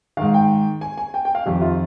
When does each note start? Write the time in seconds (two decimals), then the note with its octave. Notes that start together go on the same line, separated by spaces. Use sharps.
0.17 G#2 D#3 F5
0.34 G5
0.81 G#5
0.98 G#5
1.14 G5
1.25 G5
1.35 F5
1.46 F2 D#3 G4
1.62 F4